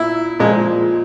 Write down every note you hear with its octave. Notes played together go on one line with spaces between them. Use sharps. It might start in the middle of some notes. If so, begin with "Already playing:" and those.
Already playing: A#2 E4
A#2 F3 G#3